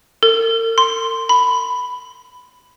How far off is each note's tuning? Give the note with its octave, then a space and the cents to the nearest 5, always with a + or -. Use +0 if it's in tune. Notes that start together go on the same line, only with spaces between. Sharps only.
A#4 -45
C6 -5
B5 +10